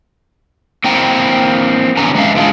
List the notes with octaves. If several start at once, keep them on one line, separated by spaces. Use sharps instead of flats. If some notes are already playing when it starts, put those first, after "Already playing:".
A#3 C4 E4 G5 A#5
B2 D3 C#4 B4 G#5 A#5
G#3 B4 E5 F5
D3 D4 F4 G#4